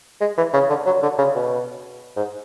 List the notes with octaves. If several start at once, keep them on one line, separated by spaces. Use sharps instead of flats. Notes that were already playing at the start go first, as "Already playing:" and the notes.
G#3
E3
C#3
D3
F#3
D3
C#3
B2
G#2